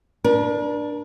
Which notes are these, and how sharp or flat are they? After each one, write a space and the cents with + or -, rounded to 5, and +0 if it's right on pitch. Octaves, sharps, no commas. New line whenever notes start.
D4 +5 A#4 +45